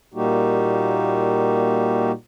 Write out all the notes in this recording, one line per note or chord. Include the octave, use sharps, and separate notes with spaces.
A#2 G3 A#3 D#4 F#4 G4